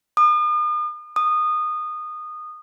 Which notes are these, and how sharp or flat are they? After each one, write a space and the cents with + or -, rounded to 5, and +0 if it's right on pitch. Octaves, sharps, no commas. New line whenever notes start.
D#6 -40
D#6 -20